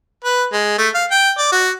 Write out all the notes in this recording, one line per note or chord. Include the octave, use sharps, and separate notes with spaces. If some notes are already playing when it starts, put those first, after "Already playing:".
B4
G#3
A3
F5
G5
D5
F#4